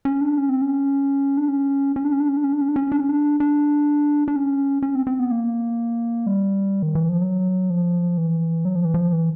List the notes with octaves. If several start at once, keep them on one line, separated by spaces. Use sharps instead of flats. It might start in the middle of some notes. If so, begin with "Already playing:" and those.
C#4
D4
C#4
C4
C#4
D4
C#4
C#4
D4
C#4
D4
C#4
D4
C#4
D4
C#4
D4
C#4
D4
C#4
D4
D4
D4
C#4
C#4
C4
C4
B3
A#3
G3
D#3
E3
F3
F#3
F3
E3
F#3
F3
E3
F3
E3